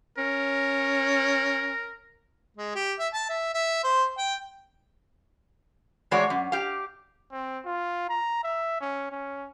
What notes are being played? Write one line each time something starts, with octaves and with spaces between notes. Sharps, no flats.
C#4 A#4
G#3
G4
E5
A5
E5
E5
C5
G5
A2 E3 G#3 F#4 C#5 D5
F#2
G4 F5
C4
F4
A#5
E5
C#4
C#4